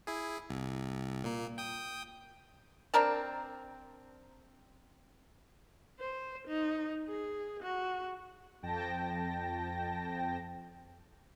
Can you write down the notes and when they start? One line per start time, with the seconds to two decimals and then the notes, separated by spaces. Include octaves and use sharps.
0.07 E4 G#4
0.49 C2
1.24 A#2 A#3
1.58 G5 D#6
2.94 C4 D4 A#4 A5
6.00 C5
6.47 D#4
7.08 G#4
7.63 F#4
8.63 F2 G5 A5 A#6